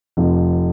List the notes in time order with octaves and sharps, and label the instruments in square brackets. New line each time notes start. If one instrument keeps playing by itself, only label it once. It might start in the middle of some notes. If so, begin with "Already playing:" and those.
[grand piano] F1 F2 F3